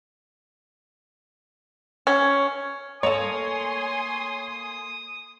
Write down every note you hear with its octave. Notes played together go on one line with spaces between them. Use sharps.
C#4
A#3 A4 C#5 G#5 C6 D#6